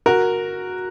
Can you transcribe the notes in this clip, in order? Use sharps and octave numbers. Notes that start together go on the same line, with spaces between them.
F#4 A#4